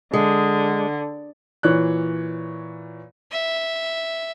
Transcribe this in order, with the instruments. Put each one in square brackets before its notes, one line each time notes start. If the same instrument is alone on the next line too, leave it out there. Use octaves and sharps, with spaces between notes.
[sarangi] D3 [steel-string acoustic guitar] G#3
[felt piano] A#2 E3 C#5 F#6
[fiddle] E5